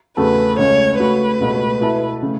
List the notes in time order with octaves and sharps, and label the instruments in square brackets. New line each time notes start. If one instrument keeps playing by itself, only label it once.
[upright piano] E2 C#3 A3 F#4 A4 [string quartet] B4
[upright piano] C#2 C#3 A3 C#4 [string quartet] C#5
[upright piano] C#3 A3 F#4 C#5 [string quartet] B4
[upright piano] C#2 B2 A3
B2 B3 E4 A4 E5
C#3 A3